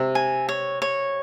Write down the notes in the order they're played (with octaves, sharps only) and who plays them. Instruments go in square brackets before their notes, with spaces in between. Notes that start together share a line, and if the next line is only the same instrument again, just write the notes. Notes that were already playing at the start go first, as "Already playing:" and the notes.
Already playing: [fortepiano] C3
[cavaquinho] G#5
C#5
C#5